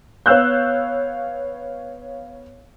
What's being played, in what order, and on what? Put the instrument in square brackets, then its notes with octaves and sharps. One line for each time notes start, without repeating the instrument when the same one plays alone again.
[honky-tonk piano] B3 C#5 F5 E6 F#6 G6